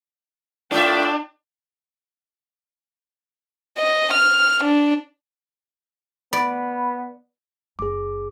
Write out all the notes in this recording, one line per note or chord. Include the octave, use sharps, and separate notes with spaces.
A2 A3 D4 F4 D5 E5 G5
D#5
F6
D4
B3 D5 B5
F#1 G#4 D6